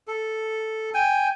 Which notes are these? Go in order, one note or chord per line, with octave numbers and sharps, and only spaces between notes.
A4
G5 G#5